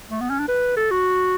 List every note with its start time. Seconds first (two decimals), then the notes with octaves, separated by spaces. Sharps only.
0.11 A3
0.21 B3
0.30 C#4
0.39 D4
0.48 B4
0.77 A4
0.91 F#4